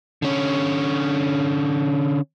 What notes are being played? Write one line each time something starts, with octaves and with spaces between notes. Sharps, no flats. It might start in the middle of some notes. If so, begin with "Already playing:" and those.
D3 C#4